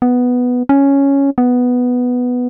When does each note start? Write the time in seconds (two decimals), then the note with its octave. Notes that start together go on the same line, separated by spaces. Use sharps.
0.02 B3
0.69 C#4
1.38 B3